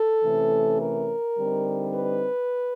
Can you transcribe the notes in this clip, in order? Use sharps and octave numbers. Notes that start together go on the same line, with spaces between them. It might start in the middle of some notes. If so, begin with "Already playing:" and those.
Already playing: A4
C3 E3 A3 C#4
A#4
D3 G3 C4 D#4
B4